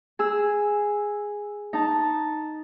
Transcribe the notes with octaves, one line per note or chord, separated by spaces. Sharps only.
G#4 E6
D#4 A5